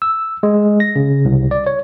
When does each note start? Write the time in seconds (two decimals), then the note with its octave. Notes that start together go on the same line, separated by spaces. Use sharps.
0.02 E6
0.43 G#3
0.80 A#6
0.96 C#3
1.25 C2
1.51 D5
1.67 C#5